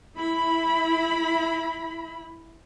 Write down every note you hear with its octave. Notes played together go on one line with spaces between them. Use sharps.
E4 B5